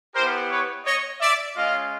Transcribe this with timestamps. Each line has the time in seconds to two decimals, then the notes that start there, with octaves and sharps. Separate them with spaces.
0.14 B3 E4 G4 A#4 C5
0.50 B4 C#5
0.85 C#5 D#5
1.20 D5 E5
1.55 G#3 C#4 F4 D#5 F5